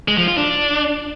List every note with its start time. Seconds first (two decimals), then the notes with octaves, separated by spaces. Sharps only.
0.08 G#3
0.18 F3
0.28 F4
0.37 D4